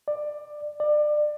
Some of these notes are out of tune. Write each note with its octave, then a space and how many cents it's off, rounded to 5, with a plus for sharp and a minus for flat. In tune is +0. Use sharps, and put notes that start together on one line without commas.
D5 +15
D5 +25